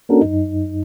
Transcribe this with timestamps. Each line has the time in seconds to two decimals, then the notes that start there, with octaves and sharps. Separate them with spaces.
0.09 A#3 C#4 D4 F#4 A4 A#4
0.21 F#2 D#4